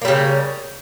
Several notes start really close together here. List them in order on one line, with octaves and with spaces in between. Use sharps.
A#3 G3 C#3